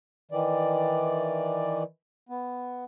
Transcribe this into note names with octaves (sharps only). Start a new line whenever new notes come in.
D#3 E3 D5
B3